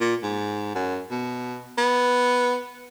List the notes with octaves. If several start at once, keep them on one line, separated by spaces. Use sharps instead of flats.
A#2
G#2
F#2
B2
B3